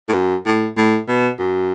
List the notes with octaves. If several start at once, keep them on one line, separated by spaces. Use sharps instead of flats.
A2
F#2
A2
A2
B2
F#2